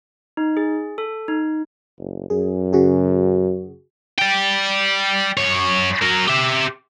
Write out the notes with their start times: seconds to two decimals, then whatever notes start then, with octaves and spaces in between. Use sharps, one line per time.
0.37 D#4
0.57 G#4
0.98 A4
1.28 D#4
1.98 F#1
2.30 F#2 G#4
2.73 C#3 F#4 G#4
4.19 D5 G5
5.37 F#2 C#5
6.02 F#3 A#4
6.28 G4 E5